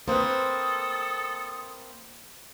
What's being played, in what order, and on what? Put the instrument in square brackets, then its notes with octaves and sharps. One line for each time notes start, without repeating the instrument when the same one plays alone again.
[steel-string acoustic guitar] A#3 C4 [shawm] A4 [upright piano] B4 C5 [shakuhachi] D#6